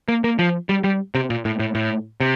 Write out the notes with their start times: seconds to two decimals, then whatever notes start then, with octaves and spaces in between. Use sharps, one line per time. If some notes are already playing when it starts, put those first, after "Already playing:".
0.08 A#3
0.24 A#3
0.39 F3
0.69 G3
0.84 G3
1.15 C3
1.30 A#2
1.45 A2
1.59 A2
1.75 A2
2.20 C3